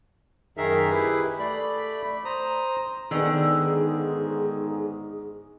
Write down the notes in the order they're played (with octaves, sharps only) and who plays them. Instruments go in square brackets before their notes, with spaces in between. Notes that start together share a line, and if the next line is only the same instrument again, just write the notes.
[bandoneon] F#2 D#3 D#4 G#4 A#4 E5
E4 G4 G#4 B4
A3 D5 B5
C5 A#5 D#6
[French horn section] G#2 [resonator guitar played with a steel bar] D3 [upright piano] D#3 B3 G#5 [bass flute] G#4